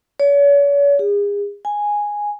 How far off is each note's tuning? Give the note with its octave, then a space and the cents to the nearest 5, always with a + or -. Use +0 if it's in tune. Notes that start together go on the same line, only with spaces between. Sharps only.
C#5 +40
G#4 -35
G#5 -5